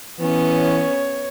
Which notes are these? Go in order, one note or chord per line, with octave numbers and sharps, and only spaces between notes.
E3 B3 C#4
C#5